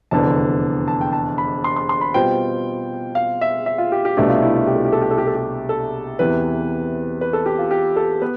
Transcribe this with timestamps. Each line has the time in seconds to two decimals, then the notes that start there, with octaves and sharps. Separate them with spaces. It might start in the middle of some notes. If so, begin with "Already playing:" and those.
0.11 F1 E2 D3 A5
0.88 A5
1.01 G5
1.13 A5
1.38 B5
1.64 C6
1.76 C6
1.89 C6
2.01 B5
2.14 B2 G3 C4 F4 C5 G5
3.15 F5
3.41 E5
3.66 E5
3.78 F4
3.92 G4
4.05 G4
4.17 C2 B2 A3 D4 G4
4.29 F4
4.42 E4
4.55 F4
4.67 G4
4.75 A4
4.85 G4
4.92 A4
5.01 G4
5.11 A4
5.18 G4
5.27 A4
5.35 G4
5.69 A4
6.19 E2 C3 E3 B4
7.21 B4
7.33 A4
7.46 G4
7.59 F4
7.71 G4
7.96 A4
8.22 B3 B4